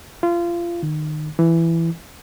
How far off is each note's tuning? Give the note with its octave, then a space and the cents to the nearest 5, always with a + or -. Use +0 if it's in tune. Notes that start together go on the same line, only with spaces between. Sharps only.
F4 -25
D#3 -30
E3 +10